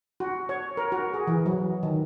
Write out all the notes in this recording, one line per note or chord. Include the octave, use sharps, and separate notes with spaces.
F#4
C#5
A#4
F#4
G#4
E3
F#3
D#3